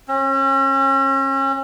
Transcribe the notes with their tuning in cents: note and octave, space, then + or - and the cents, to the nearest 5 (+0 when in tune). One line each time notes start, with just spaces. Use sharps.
C#4 -40